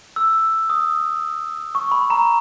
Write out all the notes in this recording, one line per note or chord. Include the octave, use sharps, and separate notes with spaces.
E6
D#6
C#6
B5
A#5